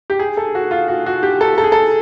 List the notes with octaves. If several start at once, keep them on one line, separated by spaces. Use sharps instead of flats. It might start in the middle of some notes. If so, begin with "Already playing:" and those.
G4
G#4
A4
F#4
F4
F#4
F#4
G4
A4
A4
G#4
A4